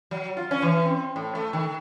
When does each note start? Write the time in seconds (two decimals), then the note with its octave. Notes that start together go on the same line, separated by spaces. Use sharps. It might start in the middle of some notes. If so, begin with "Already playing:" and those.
0.11 F#3
0.37 F4
0.51 C#4
0.62 E3
0.85 C4
1.16 A2
1.35 A3
1.53 D#3